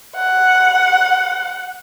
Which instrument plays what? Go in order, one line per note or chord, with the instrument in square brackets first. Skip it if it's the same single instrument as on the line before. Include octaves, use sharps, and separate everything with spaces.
[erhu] F#5